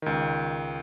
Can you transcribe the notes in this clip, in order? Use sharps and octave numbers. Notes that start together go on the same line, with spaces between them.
C#2 D#3